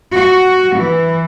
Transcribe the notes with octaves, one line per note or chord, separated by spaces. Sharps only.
F#4
E3